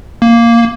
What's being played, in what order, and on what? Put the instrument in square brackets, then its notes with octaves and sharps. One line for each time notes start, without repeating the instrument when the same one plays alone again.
[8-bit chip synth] A#3